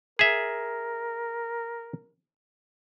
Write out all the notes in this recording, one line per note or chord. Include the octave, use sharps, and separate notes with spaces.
G#4 A#4 E5